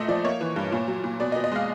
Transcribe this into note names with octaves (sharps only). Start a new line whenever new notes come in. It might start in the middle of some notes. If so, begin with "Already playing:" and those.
Already playing: A#2 A3 D#5 E5
F3 D5
A#3 C#5
E3
G2
A#2
F#3
A#2
B2 D5
D#5
B2
D#5
G#3 F5